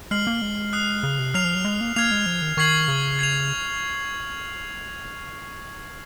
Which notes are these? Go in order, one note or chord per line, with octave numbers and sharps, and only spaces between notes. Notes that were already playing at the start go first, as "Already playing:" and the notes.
G#3 F6 C7 F#7
A#3
G#3
D#6 F#6 C7
C#3
C3
F#3 F6 C7 F7
F3
F#3
G#3
A#3
A#3 F6 G#6 C7 F7
G#3
F3
D#3
D#3 C#6 G#6 C7 F#7
C#3
G#6 C7 F7